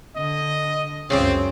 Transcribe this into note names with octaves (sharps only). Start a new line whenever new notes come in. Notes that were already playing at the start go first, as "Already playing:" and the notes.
D3 D#5
C#2 F#2 C#3 C4 G#4 D5